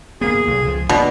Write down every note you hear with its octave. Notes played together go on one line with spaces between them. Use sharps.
G#1 A#3 B3 G#4
B1
C#2 F3
G1 B2 A#3 D4 D5